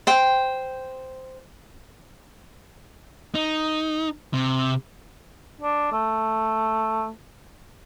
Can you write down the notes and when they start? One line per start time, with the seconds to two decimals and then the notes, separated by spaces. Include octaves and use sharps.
0.07 C5 G5
3.35 D#4
4.34 C3
5.61 D4
5.92 A3